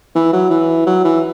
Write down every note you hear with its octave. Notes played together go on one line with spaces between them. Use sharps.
E3
F#3
E3
F#3
E3